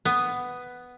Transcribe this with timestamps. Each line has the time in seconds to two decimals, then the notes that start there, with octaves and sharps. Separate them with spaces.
0.05 B3